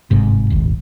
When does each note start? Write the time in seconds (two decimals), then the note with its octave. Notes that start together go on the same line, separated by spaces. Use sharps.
0.11 G1 G#2 C3
0.50 D#1 G#1